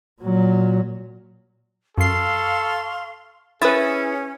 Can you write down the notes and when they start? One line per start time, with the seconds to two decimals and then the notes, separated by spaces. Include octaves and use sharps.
0.22 A#2 F#3
1.98 F#2 A4 F5 C6 C#6 C7
3.62 C#4 E4 G#4 B4 D#6 A6